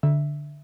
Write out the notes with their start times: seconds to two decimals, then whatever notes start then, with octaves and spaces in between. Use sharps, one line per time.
0.03 D3 E5